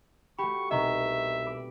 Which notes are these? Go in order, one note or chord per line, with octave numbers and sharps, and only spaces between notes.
A3 F#4 G4 B5 C#6
C2 B2 D#4 D#5 E5 A#5 C#6
B5 D6